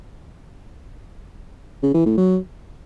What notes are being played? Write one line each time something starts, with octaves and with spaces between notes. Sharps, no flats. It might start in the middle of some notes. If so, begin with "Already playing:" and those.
C#3
E3
A2
F#3